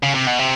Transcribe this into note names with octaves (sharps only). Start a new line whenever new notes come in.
C#3
C3
B2
C3